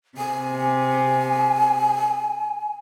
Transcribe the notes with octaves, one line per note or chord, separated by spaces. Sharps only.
C3 G#5